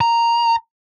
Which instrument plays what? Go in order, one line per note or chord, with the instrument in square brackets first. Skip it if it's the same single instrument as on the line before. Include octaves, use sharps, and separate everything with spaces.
[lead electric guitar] A#5